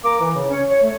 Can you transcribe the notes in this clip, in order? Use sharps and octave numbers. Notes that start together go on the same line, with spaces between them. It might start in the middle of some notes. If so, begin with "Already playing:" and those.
A#3 A#5 D6
E3
C#3
C#4 C#5
C#5
A3